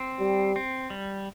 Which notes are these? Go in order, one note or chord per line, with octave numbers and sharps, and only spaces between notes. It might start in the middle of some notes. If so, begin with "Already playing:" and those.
Already playing: C4
G3
C4
G3